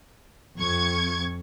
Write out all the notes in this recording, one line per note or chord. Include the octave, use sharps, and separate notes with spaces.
F2 C#6 G#6